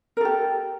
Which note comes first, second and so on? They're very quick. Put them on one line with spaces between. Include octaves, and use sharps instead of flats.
A#4 A4 G4